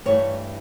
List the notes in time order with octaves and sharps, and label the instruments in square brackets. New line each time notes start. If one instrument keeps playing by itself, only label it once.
[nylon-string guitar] G2 E3 A3 C#5